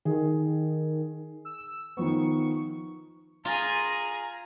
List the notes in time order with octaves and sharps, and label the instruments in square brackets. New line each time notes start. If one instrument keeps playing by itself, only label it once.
[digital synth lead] D#3 [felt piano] G#4
[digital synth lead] E6
[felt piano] D#3 F3 B3 [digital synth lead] C#6
[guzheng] F4 [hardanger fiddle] G#4 G#5 [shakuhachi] A#5